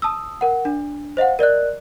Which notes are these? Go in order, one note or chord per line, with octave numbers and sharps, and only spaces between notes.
A5 D#6 E6
A#4 F#5
D4
C5 D#5 F5 F#5
A#4 D5 D#5 F#6